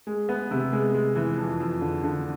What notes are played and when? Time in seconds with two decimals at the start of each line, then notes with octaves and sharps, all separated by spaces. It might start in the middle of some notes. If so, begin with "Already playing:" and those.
0.07 G#3
0.29 B3
0.51 C3
0.73 G#3
0.94 G#3
1.16 E3
1.38 F2
1.60 F2
1.81 D3
2.03 D3